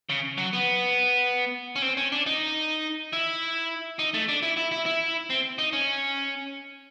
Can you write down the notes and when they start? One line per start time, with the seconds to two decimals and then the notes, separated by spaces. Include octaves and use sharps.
0.09 C#3
0.38 F#3
0.53 B3
1.76 C#4
1.82 C4
1.97 C#4
2.12 D4
2.26 D#4
3.13 E4
3.99 D#4
4.14 A3
4.28 D4
4.42 E4
4.57 E4
4.71 E4
4.86 E4
5.30 C4
5.58 D#4
5.73 C#4